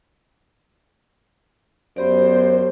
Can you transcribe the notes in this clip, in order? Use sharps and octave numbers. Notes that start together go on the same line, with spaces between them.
F#2 B3 G4 C5 D5